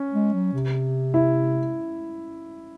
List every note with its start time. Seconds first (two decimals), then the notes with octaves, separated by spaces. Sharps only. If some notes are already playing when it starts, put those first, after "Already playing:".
Already playing: C#4
0.13 G#3
0.33 F#3
0.53 C3
1.14 E4